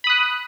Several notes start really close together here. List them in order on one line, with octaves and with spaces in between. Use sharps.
B5 D#6 F#6